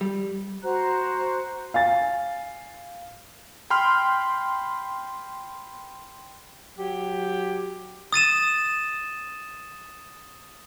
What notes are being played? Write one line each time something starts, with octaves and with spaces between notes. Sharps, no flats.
G3
F#4 C5 A#5 F#6
F5 G#5 A6
G5 B5 C6 F6
F#3 G4
D#6 A6 D#7 E7